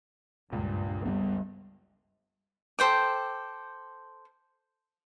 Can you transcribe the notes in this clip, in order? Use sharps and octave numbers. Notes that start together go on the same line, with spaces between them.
F#1 C#2 G2 A#2
G3 A3 B3
A4 C5 G5 D6